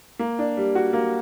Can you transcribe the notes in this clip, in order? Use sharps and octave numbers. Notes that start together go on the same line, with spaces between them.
A#3
D4
G3
F#4
A#3